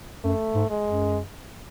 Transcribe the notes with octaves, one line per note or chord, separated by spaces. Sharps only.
F#2 A3
G#2
G#3
F#2